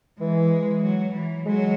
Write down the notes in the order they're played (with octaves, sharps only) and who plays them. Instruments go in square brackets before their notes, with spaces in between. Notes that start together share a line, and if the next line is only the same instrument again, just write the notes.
[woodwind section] E3 [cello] G#3
[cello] F#3
E3
[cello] F#3 [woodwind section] G#3